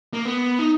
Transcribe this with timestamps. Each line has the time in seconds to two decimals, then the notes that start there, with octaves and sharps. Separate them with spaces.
0.13 A#3
0.25 B3
0.59 D#4